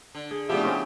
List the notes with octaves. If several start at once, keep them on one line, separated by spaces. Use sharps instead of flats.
D3
G#4
C#3 F3 A3 B3 D4 E4 G4
C4 C#4 F4